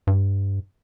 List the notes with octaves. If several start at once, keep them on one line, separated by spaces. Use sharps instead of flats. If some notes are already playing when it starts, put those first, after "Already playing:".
G2